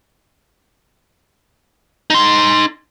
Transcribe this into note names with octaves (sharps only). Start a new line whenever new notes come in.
D#4 C6